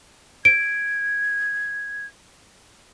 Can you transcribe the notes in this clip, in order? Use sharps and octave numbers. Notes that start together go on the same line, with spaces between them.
G#6 D7